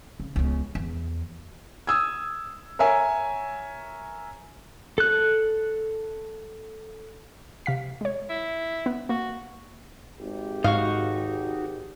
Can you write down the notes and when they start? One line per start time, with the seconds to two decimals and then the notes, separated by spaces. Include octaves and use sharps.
0.20 C#3
0.36 C#2 B3
0.75 E2
1.87 D#6 E6 G#6
2.79 A#4 C#5 E5 G#5
4.98 A4 F#6
7.66 C3 F5 B6
8.01 G#3 C#5
8.29 E4
8.86 B3
9.09 A#3 F#4
10.19 G#1 G4
10.64 G#2 D#4 F#4 F5 C#6